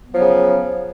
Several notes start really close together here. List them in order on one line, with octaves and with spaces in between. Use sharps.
B3 F#3 F3 C#3